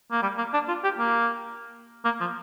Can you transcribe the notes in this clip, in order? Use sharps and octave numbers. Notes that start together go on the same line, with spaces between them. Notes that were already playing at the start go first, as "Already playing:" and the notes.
A#3
G3
A#3
D4
F4
G4
A#3
A#3
F3